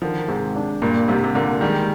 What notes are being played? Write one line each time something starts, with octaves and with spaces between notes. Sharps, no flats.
D3 D#3 F3
G#2 C3 G#3
D4
G2 A#2 A#3
G#2 C3 G3
C3
A#2 D3 A#3
D#3 G3 G#3